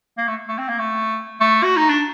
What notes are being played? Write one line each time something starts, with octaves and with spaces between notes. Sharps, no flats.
A#3
A3
A3
C4
A#3
A3
A3
F#4
D#4
D4